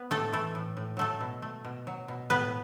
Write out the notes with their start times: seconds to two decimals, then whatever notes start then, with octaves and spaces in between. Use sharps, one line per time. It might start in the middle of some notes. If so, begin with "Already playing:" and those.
Already playing: B3 B4
0.11 A2 A3 A4
0.32 E3 A3 A4
0.55 A2
0.77 A2
0.97 F#3 A3 A4
1.21 B2
1.42 A3
1.65 B2
1.87 F#3
2.08 B2
2.30 A2 B3 B4